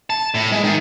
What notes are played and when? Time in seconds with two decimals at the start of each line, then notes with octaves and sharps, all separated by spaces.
0.10 A5
0.34 A2
0.52 G#3
0.64 D#3